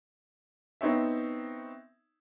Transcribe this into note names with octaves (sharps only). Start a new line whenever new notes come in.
B3 C4 D#4 C#5 E5